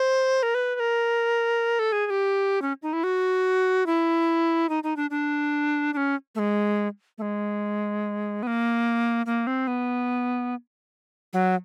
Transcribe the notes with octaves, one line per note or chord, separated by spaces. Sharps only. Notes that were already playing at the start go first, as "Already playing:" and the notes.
Already playing: C5
A#4
B4
B4
A#4
A4
G#4
G#4
G4
C#4
D#4
E4
F#4
E4
D#4
D#4
D4
D4
D4
C#4
A3
G#3
A3
G#3
B3
A#3
A#3
C4
B3
F#3